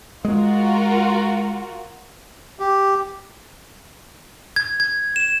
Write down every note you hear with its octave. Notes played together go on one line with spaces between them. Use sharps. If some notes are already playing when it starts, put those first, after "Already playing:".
G#3 F4 F#4 A#4
G4
G#6
G#6
E7